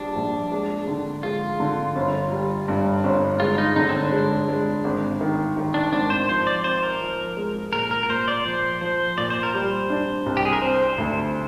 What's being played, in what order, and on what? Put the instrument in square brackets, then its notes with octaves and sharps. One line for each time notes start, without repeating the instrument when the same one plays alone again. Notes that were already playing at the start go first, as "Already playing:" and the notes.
Already playing: [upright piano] A#1 G3 [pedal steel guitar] D4
[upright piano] A#1
G#3
D3
[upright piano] G#3 [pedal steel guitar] F4
[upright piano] D3
G1
G3
G2
G1
[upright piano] G#3 [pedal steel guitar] F4
[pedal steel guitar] D#4
[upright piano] D3 [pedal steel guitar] D#4
[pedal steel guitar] C4
D4
[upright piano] G#3
G#3
G#1
D#3
D#3
[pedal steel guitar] D4
[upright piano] G#1 [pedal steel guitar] D4
[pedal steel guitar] C5
[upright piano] F3 [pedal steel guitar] C5
[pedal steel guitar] D5
[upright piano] C4 [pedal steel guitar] C5
[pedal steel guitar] A#4
[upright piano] F3
G#3
[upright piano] A#2 [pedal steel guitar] A#4
[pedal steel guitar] A#4
A#4
[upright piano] A#2 [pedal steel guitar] C5
[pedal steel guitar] D5
[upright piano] F3 [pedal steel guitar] C5
[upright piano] F3 [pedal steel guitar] C5
[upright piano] A#2 [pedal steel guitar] D5
[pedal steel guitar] C5
A#4
[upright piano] G3 [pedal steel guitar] C5
[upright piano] D4
C2
[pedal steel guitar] G4
G#4
A#4
[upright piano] C4 [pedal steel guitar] C5
[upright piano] D2